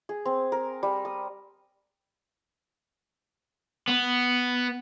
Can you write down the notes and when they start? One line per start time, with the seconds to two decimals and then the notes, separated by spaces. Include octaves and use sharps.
0.09 G#4
0.25 C4
0.52 A#4
0.83 G3
1.05 D#6
3.88 B3